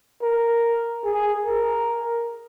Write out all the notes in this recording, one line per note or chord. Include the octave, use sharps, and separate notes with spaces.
A#4
G#4
A#4